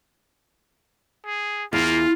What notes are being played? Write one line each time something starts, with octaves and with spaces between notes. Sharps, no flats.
G#4
E2 A#3 F4